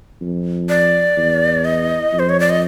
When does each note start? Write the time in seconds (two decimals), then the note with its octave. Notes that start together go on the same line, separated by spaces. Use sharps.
0.21 F2
0.69 D5
1.17 E2
1.65 D#5
2.13 F2
2.19 C5
2.29 C#5
2.40 D5
2.50 D#5